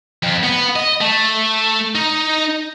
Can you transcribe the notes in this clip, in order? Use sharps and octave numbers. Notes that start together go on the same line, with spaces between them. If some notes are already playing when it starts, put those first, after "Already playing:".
F2
B3
D#5
A3
D#4